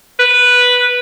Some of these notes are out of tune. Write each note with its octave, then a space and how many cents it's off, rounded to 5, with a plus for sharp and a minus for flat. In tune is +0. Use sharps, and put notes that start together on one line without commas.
B4 -5